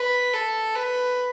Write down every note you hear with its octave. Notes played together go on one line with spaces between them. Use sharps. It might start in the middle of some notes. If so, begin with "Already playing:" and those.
Already playing: B4
A4
B4